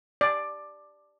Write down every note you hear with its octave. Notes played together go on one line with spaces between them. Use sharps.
D5